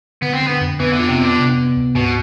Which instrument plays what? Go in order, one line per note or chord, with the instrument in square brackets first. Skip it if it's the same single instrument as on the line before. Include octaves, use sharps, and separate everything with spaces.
[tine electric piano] D3 [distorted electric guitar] B3
[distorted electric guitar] C4
[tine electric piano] D3
[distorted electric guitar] B3
[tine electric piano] F2
[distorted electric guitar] E3 [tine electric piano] B3
[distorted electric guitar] D3
[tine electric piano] F4
[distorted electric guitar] C3
[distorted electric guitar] D3 [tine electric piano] B3
[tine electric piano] C3
B3
D2
[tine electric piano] G#2 [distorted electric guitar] B2